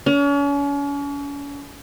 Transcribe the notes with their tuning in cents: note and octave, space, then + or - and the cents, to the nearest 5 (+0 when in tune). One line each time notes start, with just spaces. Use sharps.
C#4 +40